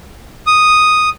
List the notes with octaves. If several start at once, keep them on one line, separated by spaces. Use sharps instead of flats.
D#6